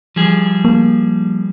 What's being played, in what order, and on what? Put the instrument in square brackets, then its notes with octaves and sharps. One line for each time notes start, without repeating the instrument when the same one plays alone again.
[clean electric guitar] F3 G3 G#4
[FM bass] A#3